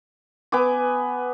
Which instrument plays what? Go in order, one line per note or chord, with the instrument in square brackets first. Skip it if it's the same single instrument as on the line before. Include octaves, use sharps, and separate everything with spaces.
[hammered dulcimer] B3 G#5 D6